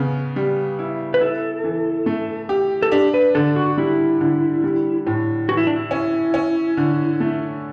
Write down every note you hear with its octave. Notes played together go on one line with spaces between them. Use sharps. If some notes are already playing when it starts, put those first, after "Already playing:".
Already playing: C#3 B3
G3
E4
B4
E4 A4
E3
A3
G4
A4
D4 G4
B4
D3 A4
F#4
G3 E4
D3
G3
A2
E3 F#4
E4
D4
E4
C#4
C#4
D3
A3